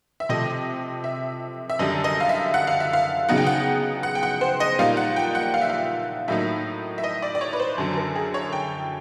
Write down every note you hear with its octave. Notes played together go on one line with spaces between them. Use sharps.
E5
C3 F3 A3 D#5
E5
E5
F#2 D3 G3 D#5
D#5
F5
E5
F#5
F5
E5
F5
C#3 F#3 B3 D#4 F#5
G5
F#5
F#5
G5
F#5
C5
D#5
A#2 G3 A#3 D#4 F5
F#5
G5
F#5
F5
E5
F5
A2 F#3 A#3 D#4 E5
E5
D#5
D5
D5
C#5
B4
C5
F#2 D3 F#3
A#4
G#4
C#5
G5